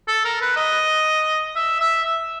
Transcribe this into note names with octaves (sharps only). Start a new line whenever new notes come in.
A4
A#4
B4
D#5
E5
E5